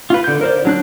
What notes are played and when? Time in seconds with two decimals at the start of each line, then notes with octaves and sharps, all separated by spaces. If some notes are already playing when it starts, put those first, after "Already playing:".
0.10 F4 B4
0.24 D3 G6
0.41 A#4 C5 D5
0.65 F#3 D4 F#6